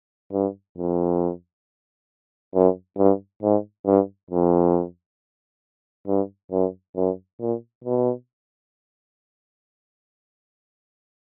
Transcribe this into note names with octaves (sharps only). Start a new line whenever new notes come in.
G2
F2
F#2
G2
G#2
G2
F2
G2
F#2
F#2
A#2
B2